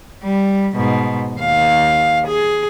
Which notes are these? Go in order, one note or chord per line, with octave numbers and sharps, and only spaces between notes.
G3
G#2 B2
D#2 F5
G#4